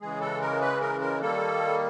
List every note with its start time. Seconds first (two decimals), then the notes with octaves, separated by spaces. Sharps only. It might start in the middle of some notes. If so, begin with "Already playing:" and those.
0.01 C#3 E3 G#3 G#4
0.21 A4
0.41 A#4
0.61 B4
0.81 A#4
1.01 A#4
1.21 D#3 G3 A#3 A4